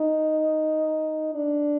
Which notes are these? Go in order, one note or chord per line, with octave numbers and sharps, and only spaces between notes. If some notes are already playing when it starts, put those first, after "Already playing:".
Already playing: D#4
D4